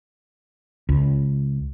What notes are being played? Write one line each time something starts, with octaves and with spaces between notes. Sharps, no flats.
C#2